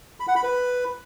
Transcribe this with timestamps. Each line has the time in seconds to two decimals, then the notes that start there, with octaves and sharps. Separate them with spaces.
0.20 B5
0.28 F#5
0.36 B5
0.43 B4